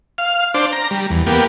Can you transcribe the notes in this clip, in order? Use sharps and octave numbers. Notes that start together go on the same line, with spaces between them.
F5 F6
D4 C5 D6
A#5
G3
E2
A#3 B3 G4